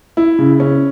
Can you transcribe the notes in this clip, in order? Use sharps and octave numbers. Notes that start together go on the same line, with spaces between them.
E4
C#3
C#4